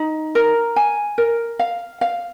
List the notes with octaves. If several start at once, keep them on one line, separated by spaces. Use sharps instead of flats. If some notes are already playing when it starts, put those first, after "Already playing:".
Already playing: D#4
A#4
G#5
A#4
F5
F5